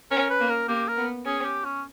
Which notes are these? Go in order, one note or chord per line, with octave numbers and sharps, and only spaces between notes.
C#4 A#4
B4
A#3
A#4
A#3 G4
A#4
B3
C#4 G#4
G4
C#4